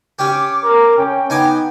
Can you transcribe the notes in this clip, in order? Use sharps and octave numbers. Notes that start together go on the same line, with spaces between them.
C#4 G4 D6
A#4
C#4 G5
B3 D#4 G#5 D6